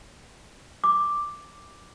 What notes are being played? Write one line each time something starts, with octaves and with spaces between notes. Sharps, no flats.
D6